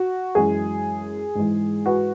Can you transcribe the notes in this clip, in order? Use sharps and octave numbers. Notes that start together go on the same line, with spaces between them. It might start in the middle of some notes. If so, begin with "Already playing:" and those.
Already playing: F#4
F#2 E3 G#3 G#4
G#2 E3 G#3
F#4 B4